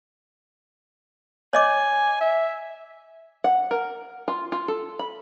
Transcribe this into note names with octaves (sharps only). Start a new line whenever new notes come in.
C#5 D#5 G#5 D6
E5
F#5
A#4
F4
F4
A4
B5